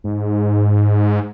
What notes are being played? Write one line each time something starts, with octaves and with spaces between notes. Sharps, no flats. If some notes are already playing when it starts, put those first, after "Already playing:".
G#2